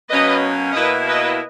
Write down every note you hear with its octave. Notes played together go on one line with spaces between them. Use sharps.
B2 F#3 A#3 C#4 B4 D#5
B2 A#3 E4 B4 D#5
B4 D#5